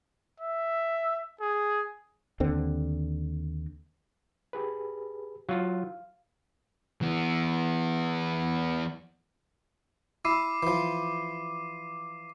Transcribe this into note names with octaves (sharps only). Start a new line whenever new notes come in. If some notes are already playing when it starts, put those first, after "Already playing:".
E5
G#4
D#2 D3 C4
G4 G#4 B4
F#3 F4 F5
E3 B3
E4 D6 C7 D#7
E3 F3